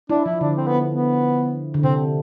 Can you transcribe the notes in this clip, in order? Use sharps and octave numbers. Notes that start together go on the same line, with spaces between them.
D4 E4
F3 E4
D3 D4
C4
B3
B3
D3
C3 C4